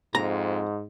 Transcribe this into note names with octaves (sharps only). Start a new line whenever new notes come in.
F2 G#2 A#5